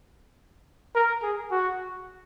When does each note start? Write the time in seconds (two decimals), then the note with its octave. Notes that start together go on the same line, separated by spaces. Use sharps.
0.95 A#4
1.23 G#4
1.51 F#4